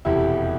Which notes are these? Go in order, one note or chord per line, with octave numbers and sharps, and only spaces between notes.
F1 E2 B2 E4 G4